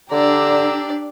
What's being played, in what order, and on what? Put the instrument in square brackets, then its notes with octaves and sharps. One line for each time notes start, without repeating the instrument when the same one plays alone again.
[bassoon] D3 [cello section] D4 [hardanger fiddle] G4 D5 [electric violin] A#5 E6